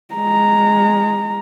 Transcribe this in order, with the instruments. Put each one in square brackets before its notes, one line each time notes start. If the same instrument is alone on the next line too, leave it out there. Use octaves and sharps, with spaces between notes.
[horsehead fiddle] G#3 A#5